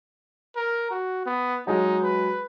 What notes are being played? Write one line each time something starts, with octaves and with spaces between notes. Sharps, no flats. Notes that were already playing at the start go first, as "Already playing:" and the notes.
A#4
F#4
B3
F#3 G#3 D#4
B4